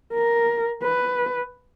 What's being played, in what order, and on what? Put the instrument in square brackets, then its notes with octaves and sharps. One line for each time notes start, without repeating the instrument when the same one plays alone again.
[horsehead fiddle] A#4
B4